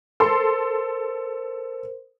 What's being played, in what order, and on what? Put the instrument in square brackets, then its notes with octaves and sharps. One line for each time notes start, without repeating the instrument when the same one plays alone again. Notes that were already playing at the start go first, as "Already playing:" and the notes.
[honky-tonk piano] A4 C6 [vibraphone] A#4 C5